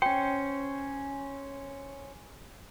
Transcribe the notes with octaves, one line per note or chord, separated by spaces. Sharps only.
C#4 C5 G5